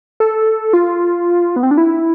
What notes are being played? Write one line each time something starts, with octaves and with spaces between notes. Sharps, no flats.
A4
F4
B3
C4
D4
E4